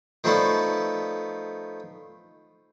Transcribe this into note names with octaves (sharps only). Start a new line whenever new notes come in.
D#3 F3 A3 B3 D5